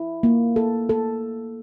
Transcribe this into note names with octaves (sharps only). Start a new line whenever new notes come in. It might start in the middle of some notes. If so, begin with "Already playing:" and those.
Already playing: E4
A#3
A4
A4